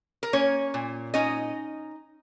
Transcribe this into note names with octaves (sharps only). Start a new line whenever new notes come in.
A#4
A#3 C#4 C#5
A#2
C#4 D#4 D#5